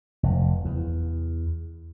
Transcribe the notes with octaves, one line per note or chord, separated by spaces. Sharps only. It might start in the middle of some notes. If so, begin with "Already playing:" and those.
F1
E2